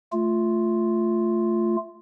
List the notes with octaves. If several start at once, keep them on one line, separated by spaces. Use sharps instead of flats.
A3 F4